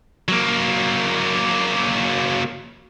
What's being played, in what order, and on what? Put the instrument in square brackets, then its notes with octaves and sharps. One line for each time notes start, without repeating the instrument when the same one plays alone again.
[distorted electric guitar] F#3 A#3